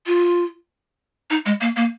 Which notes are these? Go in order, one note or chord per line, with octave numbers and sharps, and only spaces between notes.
F4
D#4
G#3
A#3
A#3